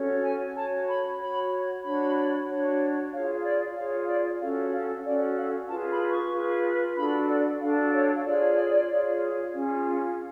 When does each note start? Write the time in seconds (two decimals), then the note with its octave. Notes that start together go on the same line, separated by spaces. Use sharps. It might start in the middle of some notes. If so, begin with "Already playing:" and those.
Already playing: C#4 F#4 A4 C#5
0.24 G#5
0.56 F#4 C#5 A5
0.88 B5
1.19 F#4 C#5 B5
1.84 D4 F#4 C#5 B5
2.48 D4 F#4 C#5
3.12 F4 G#4 C#5 F5
3.36 C#5
3.43 D5
3.76 F4 G#4 C#5 F5
4.01 C#5
4.08 D5
4.39 C#4 F#4 A4 F5
4.72 F5
5.04 C#4 F#4 A4 D5
5.36 F5
5.68 F4 G#4 B4 A5
5.90 B5
6.11 C#6
6.32 F4 G#4 B4
6.96 D4 F#4 A4 B5
7.28 D5
7.60 D4 F#4 A4 F5
7.93 C#5
8.16 F5
8.25 F4 G#4 C#5 D5
8.88 F4 G#4 C#5
9.53 C#4 F4 G#4